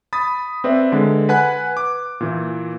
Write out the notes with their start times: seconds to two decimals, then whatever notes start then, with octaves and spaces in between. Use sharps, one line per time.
0.13 B5 D#6 A6
0.64 C4 B4 D5 E5
0.92 D3 G#3
1.29 B4 F#5 G#5 B5 F#6
1.77 D6
2.21 A#2 E3